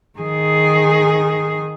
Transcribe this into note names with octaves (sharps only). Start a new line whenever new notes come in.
D#3 G#4